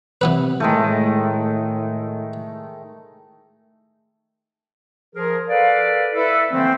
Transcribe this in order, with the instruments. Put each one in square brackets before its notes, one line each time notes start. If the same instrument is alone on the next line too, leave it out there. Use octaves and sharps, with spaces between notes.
[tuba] C3 [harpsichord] E3 B3 B4
[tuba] A2 [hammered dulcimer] D#3 G#3 A3
[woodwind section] F3 G#4 A#4
A4 B4 D5 F5
E4 A4 B4 E5
D3 E3 F3 A3 A#3 C4